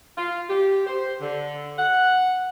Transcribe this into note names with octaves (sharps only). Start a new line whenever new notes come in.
F4
G4
C5
D3
F#5